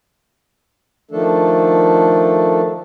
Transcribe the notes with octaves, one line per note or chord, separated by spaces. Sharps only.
D#3 F3 A3 D4 A4